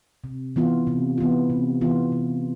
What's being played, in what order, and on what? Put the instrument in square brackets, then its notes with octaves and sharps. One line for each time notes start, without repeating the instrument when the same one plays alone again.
[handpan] C3
E3 B3 F4
C3
E3 B3 F4
C3
E3 B3 F4
C3